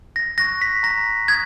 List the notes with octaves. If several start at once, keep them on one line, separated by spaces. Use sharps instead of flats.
A#6
C#6 F#6 A#6
B6
A#5 A#6
D#6 F#6 G#6